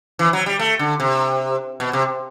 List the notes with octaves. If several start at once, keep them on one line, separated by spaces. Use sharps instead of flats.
E3
F#3
G3
A3
D3
C3
B2
C3